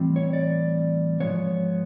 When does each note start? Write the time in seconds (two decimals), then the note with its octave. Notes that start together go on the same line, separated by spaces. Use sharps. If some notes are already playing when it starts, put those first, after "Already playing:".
Already playing: A2 E3 G3 C4
0.16 C#5
0.33 D5
1.20 G#2 F3 G#3 B3 C#5